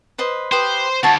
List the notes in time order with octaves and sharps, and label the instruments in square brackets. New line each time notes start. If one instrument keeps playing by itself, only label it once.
[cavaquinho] B4 C5 D#5
[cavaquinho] G4 B4 D#6 [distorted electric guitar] C5
[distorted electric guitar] D2 [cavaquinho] F#4 A5